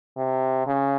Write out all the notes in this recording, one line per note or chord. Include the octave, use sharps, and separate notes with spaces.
C3
C#3